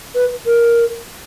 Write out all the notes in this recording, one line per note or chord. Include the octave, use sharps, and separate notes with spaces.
B4
A#4